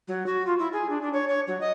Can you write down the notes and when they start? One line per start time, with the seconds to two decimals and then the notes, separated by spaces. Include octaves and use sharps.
0.08 F#3
0.26 F#4
0.47 F4
0.59 E4
0.73 G#4
0.89 D4
1.01 D4
1.13 C#5
1.28 C#5
1.47 F#3
1.60 D#5